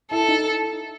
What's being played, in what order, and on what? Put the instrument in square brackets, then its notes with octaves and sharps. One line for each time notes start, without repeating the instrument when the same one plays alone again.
[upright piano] E4 [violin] A4
[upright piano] D#4